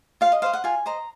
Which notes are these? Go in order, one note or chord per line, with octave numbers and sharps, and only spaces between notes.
F4 F5
D#5
C5 D#5 F5
F#5
F4 G#5
C5 D#5 A#5